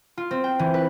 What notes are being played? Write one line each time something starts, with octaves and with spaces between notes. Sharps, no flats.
F4
C4
G5
E3
B4